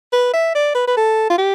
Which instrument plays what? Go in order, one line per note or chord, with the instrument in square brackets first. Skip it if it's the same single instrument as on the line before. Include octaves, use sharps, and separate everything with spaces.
[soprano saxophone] B4
E5
D5
B4
B4
A4
F4
G4